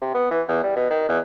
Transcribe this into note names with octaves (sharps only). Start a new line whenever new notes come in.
C3
B3
E3
E2
G3
B2
D#3
E2